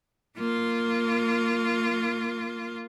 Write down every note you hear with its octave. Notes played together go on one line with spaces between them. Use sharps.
A#3 F4